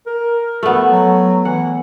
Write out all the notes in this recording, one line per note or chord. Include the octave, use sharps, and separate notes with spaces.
A#4
A3 B3
F#3
E3 F#5